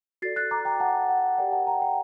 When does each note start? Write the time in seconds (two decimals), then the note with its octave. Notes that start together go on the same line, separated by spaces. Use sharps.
0.22 F#4 A4 D5 A6 C7
0.36 F#6 A6
0.51 A#5 D6
0.65 G5 A#5
0.80 F#5 A5
1.09 F#5
1.38 G4 A#4 D5 G5
1.52 F#5 A5
1.67 G5 A#5
1.82 G5